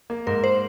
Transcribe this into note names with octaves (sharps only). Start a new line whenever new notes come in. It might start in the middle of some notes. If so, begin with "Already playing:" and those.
A#3
G#2 A#4
C5